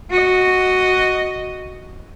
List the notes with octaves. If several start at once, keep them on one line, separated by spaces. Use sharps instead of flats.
F#4 D#5